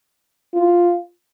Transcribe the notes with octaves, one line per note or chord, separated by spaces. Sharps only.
F4